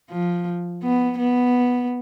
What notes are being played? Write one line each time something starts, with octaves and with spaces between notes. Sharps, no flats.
F3
B3
B3